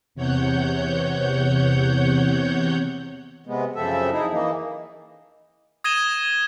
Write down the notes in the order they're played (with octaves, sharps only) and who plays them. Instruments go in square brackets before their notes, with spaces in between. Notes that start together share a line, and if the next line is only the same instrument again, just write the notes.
[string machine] E2 C3 C#5 F#5 G6
[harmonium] C3 G#3 B3
F#2 C#3 F3 C4 A4 E5
D#4 E4 G#4
E3 A#3 D#4
[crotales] D#6 G#6 A#6 D#7 E7 G7